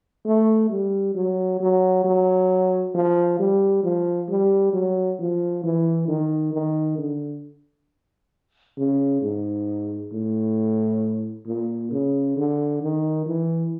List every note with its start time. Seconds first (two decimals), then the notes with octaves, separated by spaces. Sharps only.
0.25 A3
0.70 G3
1.15 F#3
1.60 F#3
2.04 F#3
2.95 F3
3.39 G3
3.84 F3
4.30 G3
4.73 F#3
5.19 F3
5.63 E3
6.08 D#3
6.54 D#3
6.98 D3
8.77 C#3
9.22 G#2
10.13 A2
11.47 A#2
11.91 C#3
12.37 D3
12.82 D#3
13.26 E3